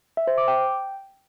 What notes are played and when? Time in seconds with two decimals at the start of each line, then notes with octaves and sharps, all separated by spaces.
0.17 E5
0.27 C5
0.38 D6
0.48 G5